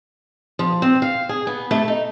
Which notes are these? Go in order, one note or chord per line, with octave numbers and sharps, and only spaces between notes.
F3
C4
F5
G#4
B3
A3
D#4